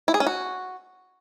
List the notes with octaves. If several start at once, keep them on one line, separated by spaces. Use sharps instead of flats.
E4
G#4
C#4
F#4